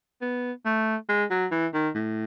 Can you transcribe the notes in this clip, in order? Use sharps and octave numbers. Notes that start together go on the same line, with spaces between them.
B3
A3
G#3
F#3
E3
D#3
A2